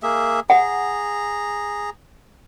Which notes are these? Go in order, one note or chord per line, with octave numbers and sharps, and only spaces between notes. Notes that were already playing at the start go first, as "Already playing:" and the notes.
A#3 G#4 E5
G#4 F#5 A#5